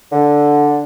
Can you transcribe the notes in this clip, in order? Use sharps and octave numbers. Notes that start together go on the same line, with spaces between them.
D3